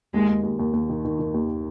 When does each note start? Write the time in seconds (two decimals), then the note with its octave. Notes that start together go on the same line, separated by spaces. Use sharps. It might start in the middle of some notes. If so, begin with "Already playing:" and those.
0.14 D#2 G#3
0.28 D#2
0.43 D#2
0.59 D#2
0.73 D#2
0.89 D#3
1.05 D#3
1.19 D#3
1.34 D#2